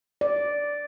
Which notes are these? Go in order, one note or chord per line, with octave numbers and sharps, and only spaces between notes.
D5